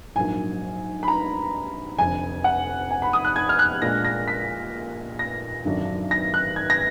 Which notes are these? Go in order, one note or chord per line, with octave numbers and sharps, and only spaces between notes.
A#1 G#2 F#3 A#3 G#5
B5
A#5
F1 F2 D3 G#5
F#5
G#5
B5
D#6
F#6
G#6
F6
F#6
A#2 G#3 D4 A#6
A#6
B6
A#6
G#1 F#2 D3 F#3 D4
A#6
F#6
G#6
A#6